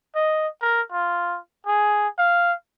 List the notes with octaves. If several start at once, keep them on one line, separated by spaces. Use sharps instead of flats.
D#5
A#4
F4
G#4
F5